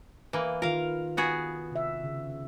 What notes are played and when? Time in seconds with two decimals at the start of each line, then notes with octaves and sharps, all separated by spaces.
0.33 E3 A#3 B4
0.62 D#3 F4 A#4 F5
1.17 B3 F#4 G#4
1.71 C3 E5
2.03 C#3